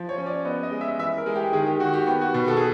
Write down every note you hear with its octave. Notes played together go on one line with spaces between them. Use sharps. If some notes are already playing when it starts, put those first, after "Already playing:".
Already playing: F3
C#5
C#4
D5
B3 D#5
D#5
G#3
E5
E3 E5
A#4
G#3
G4
D#3 G#4
G4
D#3 F#4
G4
B3 G4
F#4
B2
A4
G#4